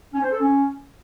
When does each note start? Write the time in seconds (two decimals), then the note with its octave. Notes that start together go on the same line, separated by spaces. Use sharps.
0.14 C#4
0.22 C5
0.31 A4
0.40 C#4